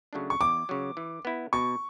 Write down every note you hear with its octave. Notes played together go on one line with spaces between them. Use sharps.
C#3 F#3 A3 D4
C#6
E2 D6
C#3 F#3
E3
B3 E4
B2 C#6